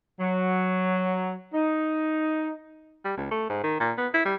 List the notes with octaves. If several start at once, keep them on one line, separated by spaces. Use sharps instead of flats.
F#3
D#4
G3
C#2
A3
G#2
D#3
A#2
B3
E4
G3